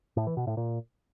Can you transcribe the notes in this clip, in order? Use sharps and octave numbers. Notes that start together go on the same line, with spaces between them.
A2
E3
B2
A2
A#2